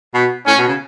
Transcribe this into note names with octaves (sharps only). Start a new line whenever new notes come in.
B2
A2 C#4
B2
C#3